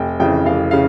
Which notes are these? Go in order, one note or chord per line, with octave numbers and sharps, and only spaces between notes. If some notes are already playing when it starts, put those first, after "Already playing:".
Already playing: F1 G5
F2 C#3 E3 G5
F1 F5
C#3 F5